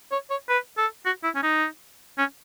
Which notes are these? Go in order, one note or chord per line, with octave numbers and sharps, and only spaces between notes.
C#5
C#5
B4
A4
F#4
E4
C#4
D#4
C#4